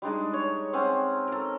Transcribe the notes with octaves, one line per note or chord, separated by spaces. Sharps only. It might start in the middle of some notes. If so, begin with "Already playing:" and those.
G3 G#3 D4 D#4
C#5
C4 C#4 F#5 G#5
A4 A#4